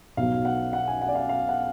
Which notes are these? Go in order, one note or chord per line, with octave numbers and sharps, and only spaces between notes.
B1 B2 F#3 F5
F#5
F#5
G#5
F#5
D5
F5
F5
F#5